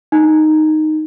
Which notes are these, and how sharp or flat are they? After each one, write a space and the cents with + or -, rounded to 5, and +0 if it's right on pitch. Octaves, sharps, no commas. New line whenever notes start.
D#4 -5